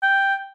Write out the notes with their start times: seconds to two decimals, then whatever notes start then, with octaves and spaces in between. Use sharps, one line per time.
0.03 G5